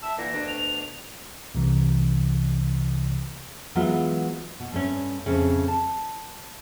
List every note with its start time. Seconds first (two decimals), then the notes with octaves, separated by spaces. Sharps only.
0.02 E5 A5
0.18 A#2 D3 E3 A#6
0.33 D2 B2 D4
0.48 F7
1.55 C2 C3 E3
3.75 E3 F#3 G#3 B3 F4 F#4
4.60 B2
4.72 G2 A3 C#4
5.26 F2 A2 C#3
5.68 A5